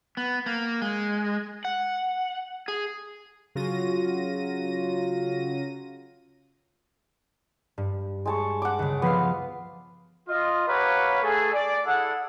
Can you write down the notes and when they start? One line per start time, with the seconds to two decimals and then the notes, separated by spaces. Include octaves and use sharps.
0.17 B3
0.46 A#3
0.82 G#3
1.65 F#5
2.68 G#4
3.55 C#3 F#3 F4 A#6 D#7
7.78 G2
8.26 G#3 A5 C#6
8.62 F#5 D6
8.79 C#2 C#3
9.02 F3 B3 B4 F5 C7
10.29 F4 D#5
10.68 G4 A#4 B4 C#5 F5 F#5
11.22 A3 G#4 A4
11.53 D5
11.86 E4 G#4 A4 F#5